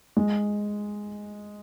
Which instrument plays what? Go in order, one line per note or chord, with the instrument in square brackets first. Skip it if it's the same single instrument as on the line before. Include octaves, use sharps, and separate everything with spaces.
[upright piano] G#3